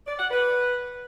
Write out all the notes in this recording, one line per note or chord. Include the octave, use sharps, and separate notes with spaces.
D5
F#5
B4